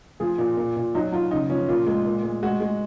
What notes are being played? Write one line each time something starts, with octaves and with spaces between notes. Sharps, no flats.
F3 G#4
A#2
A#2
A#2
F#3 D#4
F#3 F4
C#3 D#4
F3 C#4
A#2 F4
G#3
A#2
G#3
G#3 F#4
G#3